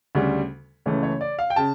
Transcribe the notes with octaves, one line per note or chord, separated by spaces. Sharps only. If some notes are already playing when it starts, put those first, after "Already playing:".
D2 C#3 G3
C#2 C#3 E3 A3 C#5
C#5
D5
F5
G5
C#3 A5